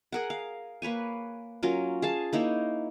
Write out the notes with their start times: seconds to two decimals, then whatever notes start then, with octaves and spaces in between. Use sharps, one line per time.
0.12 G#4 A#4 F#5
0.30 F5
0.82 A#3 B4 C#5 G#5
1.63 F#3 C#4 F4 A#4
2.02 G#4 F5 A5
2.33 A#3 D#4 E4 C#5